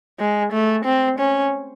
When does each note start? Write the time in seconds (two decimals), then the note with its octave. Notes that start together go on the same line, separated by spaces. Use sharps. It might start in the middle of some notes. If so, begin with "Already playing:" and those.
0.20 G#3
0.52 A3
0.85 C4
1.19 C#4